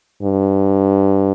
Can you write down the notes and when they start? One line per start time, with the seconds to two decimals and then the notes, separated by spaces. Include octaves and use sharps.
0.23 G2